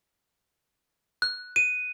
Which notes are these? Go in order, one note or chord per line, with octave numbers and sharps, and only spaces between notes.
F#6
D#7